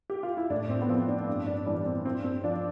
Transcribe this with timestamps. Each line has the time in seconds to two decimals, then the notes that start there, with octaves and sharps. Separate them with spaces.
0.10 G4
0.23 F4
0.37 E4
0.50 A2 D4
0.70 C4
0.82 B3
0.89 F3 C4
1.08 D4
1.28 G2
1.47 D4
1.66 E3 G3 D4
1.86 C4
2.05 G2 C4
2.24 C4
2.44 F3 D4